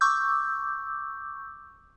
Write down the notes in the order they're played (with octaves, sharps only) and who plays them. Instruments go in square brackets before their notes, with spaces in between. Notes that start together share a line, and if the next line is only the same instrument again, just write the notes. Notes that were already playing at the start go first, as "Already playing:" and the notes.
[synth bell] C#6 D6 E6 G6